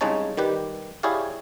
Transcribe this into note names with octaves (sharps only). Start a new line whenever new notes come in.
C2 C#3 G#3 D#4 C#5 A5
D#3 G3 G4 B4
E4 G4 G#4 C#5 D5 F5